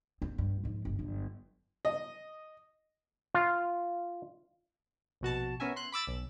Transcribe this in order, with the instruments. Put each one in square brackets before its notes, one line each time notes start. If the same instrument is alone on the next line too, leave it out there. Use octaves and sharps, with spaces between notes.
[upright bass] C4
G2
G#2 F3
G1
G1 F#2
[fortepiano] D#5
[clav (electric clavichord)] F4
[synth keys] A#1 B2 F#4 A5
B3 C#4 A#4 E5 G#5
C6 F#6
B5 D6 E6 A6
B1